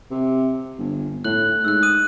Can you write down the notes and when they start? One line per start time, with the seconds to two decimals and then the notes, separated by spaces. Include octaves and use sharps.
0.11 C3
0.78 G1
1.24 A2 F#6 F#7
1.65 G#2 E6 F#6
1.83 D#6 D#7